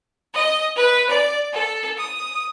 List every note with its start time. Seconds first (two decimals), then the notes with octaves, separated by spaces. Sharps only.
0.34 D#5
0.75 B4
1.10 D5
1.52 A4
1.96 D#6